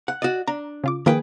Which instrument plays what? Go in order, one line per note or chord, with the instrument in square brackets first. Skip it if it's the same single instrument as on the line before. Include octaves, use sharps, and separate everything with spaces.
[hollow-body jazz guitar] F#5
[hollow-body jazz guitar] F#4 D5 [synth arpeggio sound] D#5
[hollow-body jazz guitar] D4 [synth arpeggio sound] A#5
[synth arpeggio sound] C#3 F4 D6
[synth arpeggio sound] D#3 F3 A#3 [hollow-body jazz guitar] G#4 B4 G5